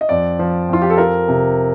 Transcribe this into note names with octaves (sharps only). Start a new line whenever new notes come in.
D#5
F2 D5
F3
F2 F4
G4
A4
F3 A#4
C3